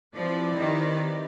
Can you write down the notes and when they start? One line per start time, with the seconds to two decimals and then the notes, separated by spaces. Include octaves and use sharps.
0.14 F3 C4 E4 G4 B4 D5
0.57 D#3